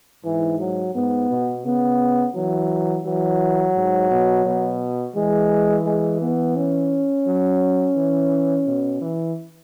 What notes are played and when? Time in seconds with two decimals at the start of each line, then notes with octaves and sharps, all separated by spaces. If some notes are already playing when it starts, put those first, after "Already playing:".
0.25 G#2 E3
0.59 F#3
0.95 G#2 B3
1.30 B2
1.65 C#3 B3
2.35 E3 F#3
3.06 E3 F#3
3.76 G#2
4.11 B2
4.45 B2
5.15 E3 G#3
5.85 G#3
6.21 B3
6.56 C#4
7.27 F#3
7.96 E3
8.67 B2
9.01 E3